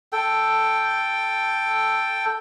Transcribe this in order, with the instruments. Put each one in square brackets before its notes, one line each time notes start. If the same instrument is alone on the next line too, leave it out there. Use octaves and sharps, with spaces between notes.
[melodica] A4 G5